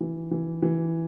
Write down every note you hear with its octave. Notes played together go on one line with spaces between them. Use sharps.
E3
E3
E3